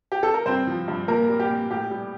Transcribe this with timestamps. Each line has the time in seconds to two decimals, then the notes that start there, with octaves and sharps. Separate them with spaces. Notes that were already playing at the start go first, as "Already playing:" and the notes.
0.12 G4
0.23 A4
0.34 A#4
0.46 G2 C4 C5
0.67 F3
0.88 G2
1.08 A#2 A#3 A#4
1.29 G3
1.39 G4
1.50 A#2
1.71 A2 G4
1.90 G3